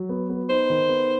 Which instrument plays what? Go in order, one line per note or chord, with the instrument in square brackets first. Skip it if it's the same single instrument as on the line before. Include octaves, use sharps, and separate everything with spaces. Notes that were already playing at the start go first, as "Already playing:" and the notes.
Already playing: [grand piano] F#3
B3
B3
[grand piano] D#4 [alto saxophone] C5
[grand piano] D#3
B3